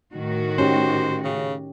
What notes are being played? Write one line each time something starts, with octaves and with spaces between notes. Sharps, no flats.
A2 D#3 F#4
C#4 G4 C5
C#3